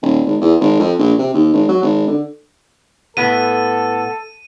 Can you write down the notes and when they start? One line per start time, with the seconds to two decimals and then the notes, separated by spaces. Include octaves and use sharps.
0.02 D#1
0.26 G#1
0.41 E2
0.60 G#1
0.80 F2
0.99 A#1
1.18 C3
1.34 D#2
1.54 G#1
1.69 F#3
1.83 G#1
2.08 D3
3.17 A2 B3 A4 D#7